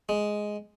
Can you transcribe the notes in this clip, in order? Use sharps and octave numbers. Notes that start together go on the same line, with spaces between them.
G#3